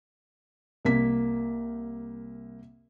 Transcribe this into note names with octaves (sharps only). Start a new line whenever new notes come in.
C2 A#3 B6